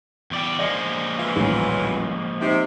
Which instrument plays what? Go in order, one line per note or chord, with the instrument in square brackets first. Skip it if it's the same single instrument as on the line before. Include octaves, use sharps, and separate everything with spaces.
[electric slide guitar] E2 D5 G5
[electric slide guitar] F3 G#3 A#3 [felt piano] D5 C#7
[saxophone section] E3 F4
[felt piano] D#1 A1
[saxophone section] C3 [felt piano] D#4